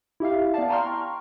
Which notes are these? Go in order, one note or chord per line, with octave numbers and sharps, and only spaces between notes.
E4 G4 E5 F5
B3 D5 F5 A5
G5 A#5 C6 C#6 F6